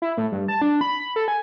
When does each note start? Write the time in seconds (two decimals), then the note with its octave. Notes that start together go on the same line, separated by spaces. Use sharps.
0.02 E4
0.17 A2
0.32 G2
0.48 A5
0.62 D4
0.81 B5
0.99 B5
1.16 A4
1.28 G#5